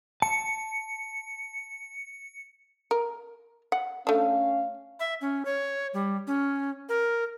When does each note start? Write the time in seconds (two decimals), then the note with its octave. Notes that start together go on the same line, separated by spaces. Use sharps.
0.22 A5 C#7
2.91 A#4
3.72 F#5
4.07 A3 C#4 D4 F5
5.00 E5
5.21 C#4
5.45 C#5
5.94 G3
6.27 C#4
6.89 A#4